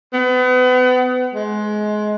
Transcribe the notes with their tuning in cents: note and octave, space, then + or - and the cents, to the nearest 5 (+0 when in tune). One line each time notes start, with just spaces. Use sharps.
B3 +35
G#3 +25